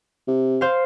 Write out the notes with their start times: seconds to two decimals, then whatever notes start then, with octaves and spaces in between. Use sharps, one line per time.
0.28 C3
0.61 C5 F5